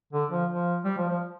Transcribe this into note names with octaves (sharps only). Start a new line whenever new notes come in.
D3
F3
F3
G3
F3
F3